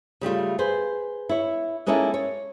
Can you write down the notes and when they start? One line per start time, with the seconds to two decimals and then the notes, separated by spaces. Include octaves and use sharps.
0.21 C#3 G3 A3 F4
0.59 G#4 B4 C5
1.29 E4 C#5
1.87 G#3 A#3 C#4 D#4 E4 A4
2.14 C#5